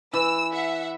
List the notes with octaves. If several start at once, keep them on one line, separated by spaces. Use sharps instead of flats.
E3 E6
E5 F#5